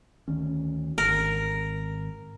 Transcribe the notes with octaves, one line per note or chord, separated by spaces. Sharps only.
D2 D#3 C#4
G#1 A#4